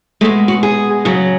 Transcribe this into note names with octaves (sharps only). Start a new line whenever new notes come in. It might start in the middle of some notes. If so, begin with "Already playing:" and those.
B2 G#3 A3
F#4
G#4
C#3 F#3